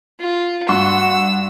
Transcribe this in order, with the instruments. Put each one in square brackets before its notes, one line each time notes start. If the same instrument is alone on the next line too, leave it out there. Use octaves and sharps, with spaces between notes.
[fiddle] F4
[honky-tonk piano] G2 F#5 C6 [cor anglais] F#4 [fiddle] E6